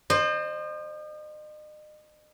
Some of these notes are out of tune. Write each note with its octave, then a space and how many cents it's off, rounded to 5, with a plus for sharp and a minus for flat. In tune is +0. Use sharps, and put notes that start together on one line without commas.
C5 +15 D#5 -40